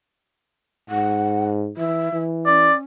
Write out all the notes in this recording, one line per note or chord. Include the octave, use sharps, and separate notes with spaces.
G#2 F#5
E3 E5
E3
C#4 D5